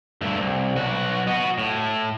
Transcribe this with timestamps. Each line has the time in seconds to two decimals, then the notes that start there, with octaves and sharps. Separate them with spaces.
0.21 G2 A3
0.39 C2
0.76 B1 F#4
1.27 F#4 D#5
1.58 A2